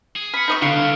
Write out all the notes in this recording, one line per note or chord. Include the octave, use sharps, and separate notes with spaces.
G#4
B5 F6 C#7
D#4 D#5 C#6 C#7
D3 D#3 B3 F5 C#7 D7
C2